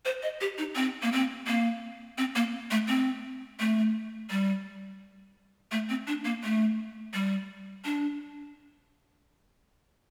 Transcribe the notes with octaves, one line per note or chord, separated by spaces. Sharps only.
C5
D#5
G4
D#4
C4
A#3
C4
A#3
C4
A#3
A3
C4
A3
G3
A3
C4
D4
A#3
A3
G3
D4